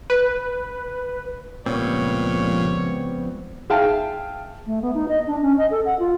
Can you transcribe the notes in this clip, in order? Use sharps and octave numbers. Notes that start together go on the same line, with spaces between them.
B4
C#2 A#2 F3 G3 B3 C4 C#5
G#4 E5 F5 G5 A5
A3
B3
D#4
D#5
D4
C#4
D#5
A4
F#5
F4